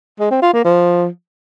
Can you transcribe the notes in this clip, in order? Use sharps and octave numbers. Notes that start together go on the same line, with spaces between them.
G#3
C4
F4
A#3
F3